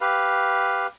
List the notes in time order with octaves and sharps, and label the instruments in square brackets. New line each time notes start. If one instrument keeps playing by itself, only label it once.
[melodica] G4 B4 F5